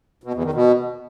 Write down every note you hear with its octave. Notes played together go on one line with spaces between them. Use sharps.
B2
E2
D#3
B2